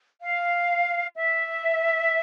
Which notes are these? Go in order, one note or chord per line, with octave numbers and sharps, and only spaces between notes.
F5
E5